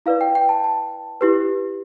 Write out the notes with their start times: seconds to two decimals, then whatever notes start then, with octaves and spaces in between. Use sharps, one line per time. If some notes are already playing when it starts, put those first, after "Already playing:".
0.06 E4 B4 D5 F5
0.21 G5
0.35 G5
0.49 A5
0.64 A5
1.21 E4 G4 B4